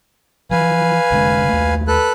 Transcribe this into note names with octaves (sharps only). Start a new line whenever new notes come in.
E3 F3 B4 F5 G#5
F1 D3 G#3
D#2 A3
A4 B4 F#6